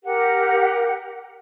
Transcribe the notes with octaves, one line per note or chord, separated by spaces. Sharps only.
G4 A#4 F#5